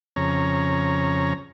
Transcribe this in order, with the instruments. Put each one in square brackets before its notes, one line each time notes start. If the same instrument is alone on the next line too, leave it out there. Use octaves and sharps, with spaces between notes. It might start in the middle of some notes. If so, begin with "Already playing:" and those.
[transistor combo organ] F2 C#3 C#5 A#5